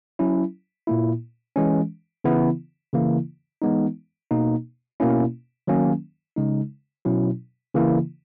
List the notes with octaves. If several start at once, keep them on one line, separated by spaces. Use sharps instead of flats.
F#3 C#4 E4
A#2 A#3 E4
E3 G#3 C#4
C#3 E3 B3 E4
C#3 E3 A#3 E4
E3 G#3 B3 D#4
B2 A#3 D#4
B2 A#3 C#4 E4
D#3 F#3 A#3 C#4
C#3 G#3 D#4
B2 F#3 C#4 E4
C#3 E3 A#3 E4